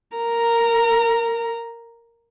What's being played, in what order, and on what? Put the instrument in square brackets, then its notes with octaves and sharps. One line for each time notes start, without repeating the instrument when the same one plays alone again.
[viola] A#4 A#5